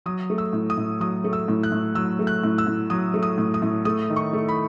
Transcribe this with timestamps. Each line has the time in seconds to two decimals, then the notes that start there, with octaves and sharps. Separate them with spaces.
0.06 F#3 D#6
0.30 A3
0.38 E6
0.53 A2
0.70 D#6
0.77 A2
1.00 F#3 D#6
1.24 A3
1.33 E6
1.48 A2
1.63 F#6
1.72 A2
1.95 F#3 E6
2.19 A3
2.27 F#6
2.44 A2
2.58 E6
2.67 A2
2.90 F#3 D#6
3.14 A3
3.23 D#6
3.38 A2
3.54 D#6
3.62 A2
3.85 A3 D#6
4.09 D#3
4.16 C#6
4.33 A3
4.49 B5